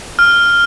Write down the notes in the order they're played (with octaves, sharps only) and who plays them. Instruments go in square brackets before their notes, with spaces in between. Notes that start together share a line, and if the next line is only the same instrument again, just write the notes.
[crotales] F6